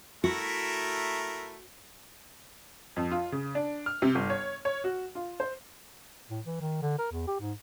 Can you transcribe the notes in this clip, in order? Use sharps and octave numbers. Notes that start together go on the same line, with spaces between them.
A3 E4 F#4 A#4
F2
F4
C#3
D4
F6
C3
G1
C#5
C#5
F#4
F4
C5
A2
E3
D#3
D3
A#4
E2
G4
G#2